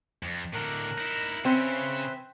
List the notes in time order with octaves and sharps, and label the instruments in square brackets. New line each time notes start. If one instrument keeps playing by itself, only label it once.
[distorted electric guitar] F2
[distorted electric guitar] A2 D3 [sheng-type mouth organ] A#4 F#6
[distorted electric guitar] D#4 E4
[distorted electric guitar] C#3 [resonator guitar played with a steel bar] C4 [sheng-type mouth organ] B4 C5 E5